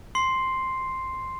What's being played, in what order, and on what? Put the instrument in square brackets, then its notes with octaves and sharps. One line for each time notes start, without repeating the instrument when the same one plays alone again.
[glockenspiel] C6 C7